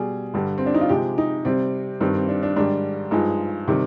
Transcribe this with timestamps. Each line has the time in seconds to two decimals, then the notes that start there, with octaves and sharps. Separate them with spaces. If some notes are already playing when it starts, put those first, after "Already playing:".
Already playing: B2 G3 G#4
0.34 G2 D3 G3
0.58 C4
0.66 D4
0.74 D#4
0.81 F4
0.89 C3 F3 G#3 G4
1.18 D#4
1.45 C3 G3 C4
2.01 G2 D#3 G3 C4
2.14 C4
2.29 D4
2.43 D4
2.56 G#2 D#3 G3 D4
3.11 G2 F3 G#3 D#4
3.68 C3 D#3 G3